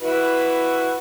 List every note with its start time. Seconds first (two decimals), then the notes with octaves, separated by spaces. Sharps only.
0.01 E4 F#4 B4